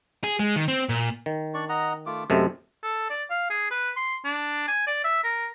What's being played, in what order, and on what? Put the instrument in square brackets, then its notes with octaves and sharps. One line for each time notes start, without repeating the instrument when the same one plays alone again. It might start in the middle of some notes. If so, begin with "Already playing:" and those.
[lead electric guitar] G#4
G#3
D#3
C4
A#2
[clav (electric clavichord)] D#3
[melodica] D4 D5 C#6
D#5 F#5 A#5
A3 F4 D6
[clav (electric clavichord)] F#2 C3 A3 [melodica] G#3
[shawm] A4
D5
F5
G#4
B4
C6
D4
G#5
D5
E5
A#4